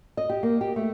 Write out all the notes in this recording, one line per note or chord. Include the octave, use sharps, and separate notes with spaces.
D#5
G4
A#3
G4
A3